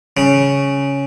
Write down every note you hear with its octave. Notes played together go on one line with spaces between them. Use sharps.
C#3